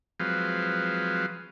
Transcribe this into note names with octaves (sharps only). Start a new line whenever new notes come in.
F3 F#3 G#3 C4 B4 F5